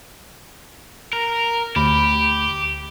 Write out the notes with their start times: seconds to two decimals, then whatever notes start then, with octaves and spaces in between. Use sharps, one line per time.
1.13 A#4
1.76 D2 G4 B5